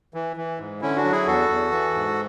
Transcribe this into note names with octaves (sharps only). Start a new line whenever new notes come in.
E3
E3
G#2
D3 C#4 E4
D4 F#4
F#3
E4 G#4
E2 F#4 A4
E2
E3
G#2